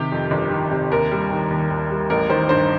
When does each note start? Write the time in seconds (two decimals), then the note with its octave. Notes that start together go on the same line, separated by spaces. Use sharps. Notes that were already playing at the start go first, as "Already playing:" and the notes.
Already playing: C3 D#3 G4
0.12 F2
0.31 G1
0.51 D#3
0.71 C3
0.91 D#2 A#4
1.11 G3
1.31 D#3
1.50 D#2
1.70 D#2
1.91 G3
2.10 A1 A#4
2.29 D#3 C5
2.49 G2 C5